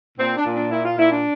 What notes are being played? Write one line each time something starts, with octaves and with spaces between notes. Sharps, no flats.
A#2 C4
D4
A#2
D4
A#2 E4
F4
A#2 E4
D4